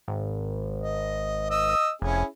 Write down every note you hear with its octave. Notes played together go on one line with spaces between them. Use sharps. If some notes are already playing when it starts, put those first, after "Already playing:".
G#1
D#5
D#5 D#6 E6
F1 C#4 E4 G#4